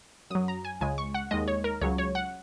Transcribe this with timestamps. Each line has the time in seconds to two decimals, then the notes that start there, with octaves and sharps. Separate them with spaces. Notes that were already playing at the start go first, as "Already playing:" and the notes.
0.30 F#2 F#3 D#6
0.48 A#5
0.65 G#5
0.81 C#2 C#3 G#3 G#5
0.98 C#6
1.14 F#5
1.31 D#2 D#3 G#3 D#5
1.48 C#5
1.64 A#4
1.81 C#2 C#3 F#3 C#5
1.98 C#5
2.15 F#5